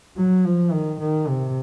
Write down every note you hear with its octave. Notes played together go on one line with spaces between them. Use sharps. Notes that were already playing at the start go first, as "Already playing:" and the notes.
F#3
F3
D#3
D#3
C3